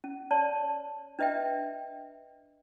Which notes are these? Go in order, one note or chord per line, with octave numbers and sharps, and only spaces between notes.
C#4
C#5 D5 A5
D4 B4 D#5 E5 G5